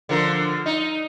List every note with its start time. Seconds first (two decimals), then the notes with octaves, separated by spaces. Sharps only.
0.09 D3 F3 A#4
0.66 D#4